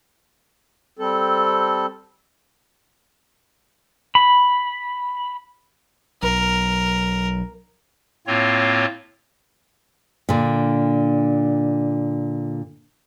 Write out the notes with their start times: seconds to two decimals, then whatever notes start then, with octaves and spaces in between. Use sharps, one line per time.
0.99 G3 C4 A4
4.15 B5
6.23 B1 A#4
8.27 A2 A#3 C4 F4 C#5
10.29 A#2 D3